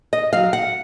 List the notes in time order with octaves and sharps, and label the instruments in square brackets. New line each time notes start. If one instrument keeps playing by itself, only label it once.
[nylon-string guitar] D#5
F#3 F5
F#5